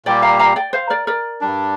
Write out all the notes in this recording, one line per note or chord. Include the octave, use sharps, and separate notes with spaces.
A#2 G3 A#3 G4 D5 G5
F5 A#5
F5 A#5
D5 G5
C5 F5
A#4 D5
A#4 D5
G2 G3 D4